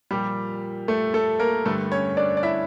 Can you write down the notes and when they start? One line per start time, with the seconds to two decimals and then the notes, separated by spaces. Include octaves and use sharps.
0.11 A#2 F3 G3 G4
0.88 A3 A4
1.14 A3 A4
1.40 A#3 A#4
1.65 G2 D3 G3 A3 A4
1.92 C#4 C#5
2.17 D4 D5
2.37 D5
2.43 E4 E5